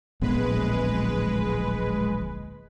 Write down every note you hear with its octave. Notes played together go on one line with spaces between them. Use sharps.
D1 A#1 G#3 B3 B4